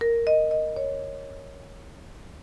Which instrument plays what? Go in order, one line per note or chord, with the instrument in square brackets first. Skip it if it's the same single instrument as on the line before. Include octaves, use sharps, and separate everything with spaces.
[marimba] A#4
D#5
D#5
C#5